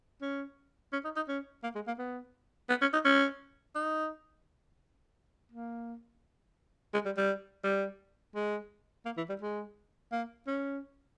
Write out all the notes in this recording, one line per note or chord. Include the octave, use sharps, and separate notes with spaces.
C#4
C#4
D#4
D#4
C#4
A#3
G#3
A#3
B3
B3
C#4
D#4
C#4
D#4
A#3
G#3
G3
G3
G3
G#3
A#3
E3
G3
G#3
A#3
C#4